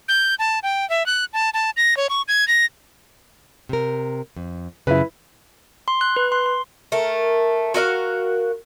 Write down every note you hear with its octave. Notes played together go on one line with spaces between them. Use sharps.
G6
A5
G5
E5
F#6
A5
A5
A#6
C#5
C#6
G#6
A#6
C3 A#4
F2
F#2 C#3 E4 B4
C6
F#6
B4
C6
C6
A3 A#4
F#4 A#4 D#5 F5